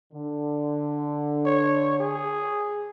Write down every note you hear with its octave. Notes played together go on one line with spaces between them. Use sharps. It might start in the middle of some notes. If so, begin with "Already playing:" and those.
D3
C#5
G#4